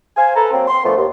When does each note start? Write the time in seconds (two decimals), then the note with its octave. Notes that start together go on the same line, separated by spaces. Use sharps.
0.16 C5 F5 G#5
0.35 A4 B4 A#5
0.51 F#3 A#3 C4
0.68 C6
0.84 A#2 D3 F3 A3 B3
0.96 D#2